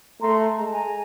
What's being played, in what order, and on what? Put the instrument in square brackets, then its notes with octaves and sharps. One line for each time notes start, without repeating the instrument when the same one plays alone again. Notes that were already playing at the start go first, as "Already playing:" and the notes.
[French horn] A3 [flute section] A#5 C6
[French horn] G#3 [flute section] A#5
[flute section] A5
G#5 A#5